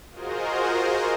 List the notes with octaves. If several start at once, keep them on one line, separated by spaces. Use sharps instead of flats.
F4 F#4 G#4 A#4 C5 D#5